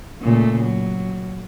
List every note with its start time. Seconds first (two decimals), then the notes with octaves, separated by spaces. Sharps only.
0.21 A#2 C#3 A3
0.63 F#3